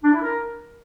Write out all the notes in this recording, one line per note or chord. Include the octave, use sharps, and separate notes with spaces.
D4
E4
A#4